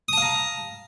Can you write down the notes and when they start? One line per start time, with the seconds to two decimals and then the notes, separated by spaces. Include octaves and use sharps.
0.08 D#6
0.13 A5
0.18 F5
0.22 A#5